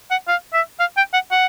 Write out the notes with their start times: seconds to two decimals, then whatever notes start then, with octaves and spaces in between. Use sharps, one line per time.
0.11 F#5
0.28 F5
0.53 E5
0.80 F5
0.97 G5
1.14 F#5
1.31 F#5